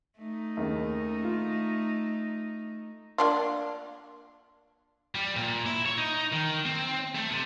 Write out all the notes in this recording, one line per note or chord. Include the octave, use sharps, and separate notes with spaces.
A3 D#4
D#2 C#3
F4
A#3 D4 F4
G3
A#2
E4
C#5
D#4
D#3
C4
A3
C3